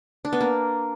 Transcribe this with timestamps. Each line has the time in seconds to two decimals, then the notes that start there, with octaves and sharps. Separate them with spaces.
0.25 D4
0.33 B3
0.40 A#3